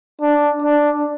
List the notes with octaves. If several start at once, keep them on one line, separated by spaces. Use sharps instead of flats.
D4
D4